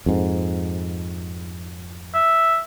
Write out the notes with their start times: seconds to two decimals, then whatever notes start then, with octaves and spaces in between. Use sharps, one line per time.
0.06 F2 G#2
2.14 E5